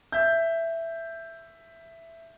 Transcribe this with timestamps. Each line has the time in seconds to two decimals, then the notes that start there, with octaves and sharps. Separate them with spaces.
0.12 E5 G6